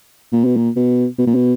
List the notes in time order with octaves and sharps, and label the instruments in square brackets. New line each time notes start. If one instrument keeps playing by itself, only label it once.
[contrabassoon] A#2
B2
A#2
B2
B2
A#2
B2